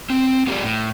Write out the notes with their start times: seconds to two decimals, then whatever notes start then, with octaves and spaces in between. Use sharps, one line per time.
0.10 C4
0.47 B3 F4 G4 G#4 D5
0.64 A2